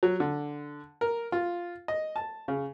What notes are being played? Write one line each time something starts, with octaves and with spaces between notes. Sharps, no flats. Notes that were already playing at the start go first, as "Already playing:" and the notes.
F#3
D3
A#4
F4
D#5
A5
C#3